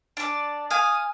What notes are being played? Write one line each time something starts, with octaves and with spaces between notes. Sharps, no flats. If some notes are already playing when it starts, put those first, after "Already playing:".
D4 D5
F5 G#5 D#6